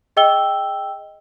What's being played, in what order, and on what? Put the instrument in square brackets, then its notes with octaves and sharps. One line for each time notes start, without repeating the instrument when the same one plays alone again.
[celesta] G#4 D#5 G5 E6 G7